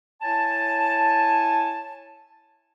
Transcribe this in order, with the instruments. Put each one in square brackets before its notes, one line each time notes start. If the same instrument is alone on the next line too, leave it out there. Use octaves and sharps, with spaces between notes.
[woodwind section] E4 C#5 G#5 A5